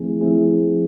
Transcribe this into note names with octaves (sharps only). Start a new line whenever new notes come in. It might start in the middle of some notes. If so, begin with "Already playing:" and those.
Already playing: F3 A3 C4 E4 G#4
F3 A3 C4 E4 G#4